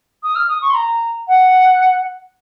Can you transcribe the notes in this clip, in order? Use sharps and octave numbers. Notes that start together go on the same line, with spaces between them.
D#6
F6
D#6
C#6
C6
A#5
F#5